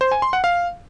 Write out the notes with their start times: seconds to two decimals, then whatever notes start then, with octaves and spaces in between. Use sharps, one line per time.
0.01 C5
0.12 G#5
0.22 C6
0.33 F#5
0.44 F5